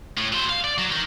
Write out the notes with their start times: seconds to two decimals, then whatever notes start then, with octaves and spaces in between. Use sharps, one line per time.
0.18 A2
0.33 F#3 C5
0.49 F5
0.64 D5
0.78 F#3
0.91 D#4 A#4